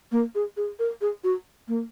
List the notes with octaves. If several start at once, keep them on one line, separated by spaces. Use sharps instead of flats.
A#3
G#4
G#4
A#4
G#4
F#4
A#3